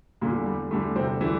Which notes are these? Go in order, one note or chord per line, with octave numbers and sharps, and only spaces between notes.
E2 A#2 D3 G3 A#3
G3
E2 D3 G3 A3
C3 C4
D3 E3 G3 E4